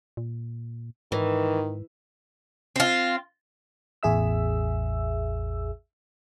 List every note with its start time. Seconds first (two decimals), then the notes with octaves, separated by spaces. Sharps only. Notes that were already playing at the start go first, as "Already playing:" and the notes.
0.17 A#2
1.12 G#2 D#3 E3
2.76 C4 F4
4.03 A1 E2 G#4 E5 E6